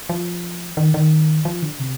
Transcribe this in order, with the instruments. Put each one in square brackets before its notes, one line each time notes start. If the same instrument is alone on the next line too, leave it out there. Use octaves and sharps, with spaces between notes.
[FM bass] F3
D#3
D#3
F3
D3
C3